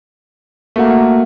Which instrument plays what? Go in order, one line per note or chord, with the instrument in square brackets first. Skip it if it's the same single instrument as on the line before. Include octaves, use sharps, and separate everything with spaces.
[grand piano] A3 F#4 [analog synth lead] A#3